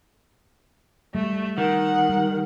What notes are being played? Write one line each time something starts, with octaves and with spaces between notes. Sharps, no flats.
G3 A3
D#3 F#5
G3